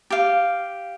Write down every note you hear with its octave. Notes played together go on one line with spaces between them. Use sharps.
G4 F5